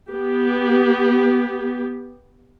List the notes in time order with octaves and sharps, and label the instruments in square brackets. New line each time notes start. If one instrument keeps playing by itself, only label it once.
[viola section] B3 G4